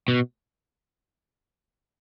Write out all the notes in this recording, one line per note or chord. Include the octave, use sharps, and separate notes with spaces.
B2